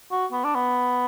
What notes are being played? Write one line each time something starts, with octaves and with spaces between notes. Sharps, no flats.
F#4
B3
D4
B3